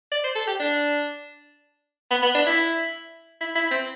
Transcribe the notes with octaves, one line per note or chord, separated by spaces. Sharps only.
D5
C5
A4
G4
D4
B3
B3
D4
E4
E4
E4
C4